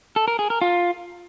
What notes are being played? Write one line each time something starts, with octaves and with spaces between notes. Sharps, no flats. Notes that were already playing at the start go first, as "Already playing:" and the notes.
A4
A#4
G#4
A#4
F4